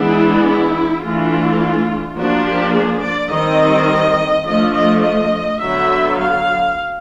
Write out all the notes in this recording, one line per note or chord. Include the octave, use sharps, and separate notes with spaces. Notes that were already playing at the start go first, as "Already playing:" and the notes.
Already playing: E3 G#3 B3 D4 E4
E4
E3 A3 D4 F4
F3 A#3 D4 F#4
G4
G#4
D5
D#3 G3 C4 D#5
F3 A3 D4 D#5
D#5
D#5
D3 F#3 B3 E5
F5